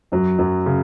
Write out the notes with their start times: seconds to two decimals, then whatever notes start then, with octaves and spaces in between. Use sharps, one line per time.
0.12 F#2 F#3
0.38 F#2 F#3
0.66 C#3